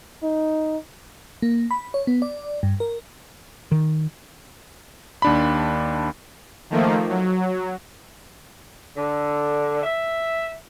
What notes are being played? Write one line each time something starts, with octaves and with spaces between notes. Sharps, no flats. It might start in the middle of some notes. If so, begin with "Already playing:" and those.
D#4
A#3
B5
C#5
B3
D5
G2
A#4
D#3
D#2 D4 B5
D#3 F3 A3 A#3
F#3
D3
E5